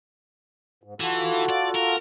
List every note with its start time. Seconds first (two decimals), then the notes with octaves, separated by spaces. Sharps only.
0.83 G#2
1.00 E3 F4 F#4 A4
1.50 D5
1.75 A#4